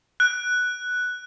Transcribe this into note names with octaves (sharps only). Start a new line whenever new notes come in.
F#6